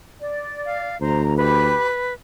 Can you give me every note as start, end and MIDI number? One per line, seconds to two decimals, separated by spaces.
0.21 0.95 74
0.66 0.97 77
1.01 1.74 38
1.01 1.23 72
1.01 1.33 82
1.37 1.88 67
1.37 2.13 71
1.37 1.88 83